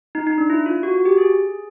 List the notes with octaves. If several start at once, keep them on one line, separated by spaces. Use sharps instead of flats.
D#4
D#4
D4
E4
F4
F#4
F#4
G4
G#4